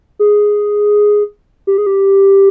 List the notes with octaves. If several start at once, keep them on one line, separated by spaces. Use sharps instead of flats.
G#4
G4
G#4
G4